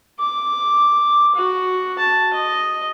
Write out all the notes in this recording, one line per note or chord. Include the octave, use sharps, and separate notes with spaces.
D6
F#4
A5
D#5